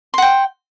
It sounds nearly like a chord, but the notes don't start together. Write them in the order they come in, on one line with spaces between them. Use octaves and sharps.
C6 F#5 G5